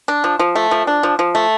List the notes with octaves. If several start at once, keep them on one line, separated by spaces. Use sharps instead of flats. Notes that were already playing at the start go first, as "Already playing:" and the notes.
D4
F3
F3
A3
F3
D4
F3
F3
A3